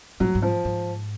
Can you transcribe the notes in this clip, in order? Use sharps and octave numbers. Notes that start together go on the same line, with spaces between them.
A2 F#3
G#2
F3
G#2